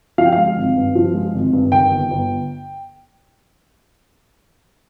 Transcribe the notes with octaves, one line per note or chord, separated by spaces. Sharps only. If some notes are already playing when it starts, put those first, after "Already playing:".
F3 F5
G5
F5
G#3
G#1
G2
F3
G#3
G#1
G2
D#3 G5
G1
G1